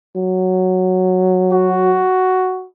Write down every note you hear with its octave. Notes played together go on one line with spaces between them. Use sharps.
F#3
F#4